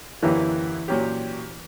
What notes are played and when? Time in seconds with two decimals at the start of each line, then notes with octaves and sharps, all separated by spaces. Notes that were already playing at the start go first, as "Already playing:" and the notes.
0.23 F#2 D3 E3 A#3 E4 G4
0.88 A#2 F#3 C#4 G4